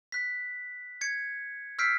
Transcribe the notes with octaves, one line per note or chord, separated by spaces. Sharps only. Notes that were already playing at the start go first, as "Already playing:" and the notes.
F#6 B6
G#6 C#7
E6 F6 G6 B6 C7 D7